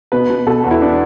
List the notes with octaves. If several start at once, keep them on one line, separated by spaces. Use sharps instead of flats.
B2 B4
B2
B2 A4
E2
E4
D4